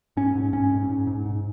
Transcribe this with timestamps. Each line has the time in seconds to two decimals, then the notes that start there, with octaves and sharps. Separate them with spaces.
0.17 G#2 C#4
0.35 G#2
0.53 G#2 C#4
0.71 G#2
0.89 G#2
1.07 G#2
1.26 G#2